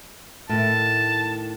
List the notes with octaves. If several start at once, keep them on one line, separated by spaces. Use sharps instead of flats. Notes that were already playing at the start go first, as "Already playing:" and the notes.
A2 D#3 A5